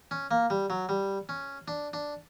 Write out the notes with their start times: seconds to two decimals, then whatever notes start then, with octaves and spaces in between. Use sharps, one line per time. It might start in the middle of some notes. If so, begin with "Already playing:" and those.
0.11 C#4
0.31 A#3
0.50 G3
0.70 F#3
0.89 G3
1.29 C#4
1.68 D4
1.93 D4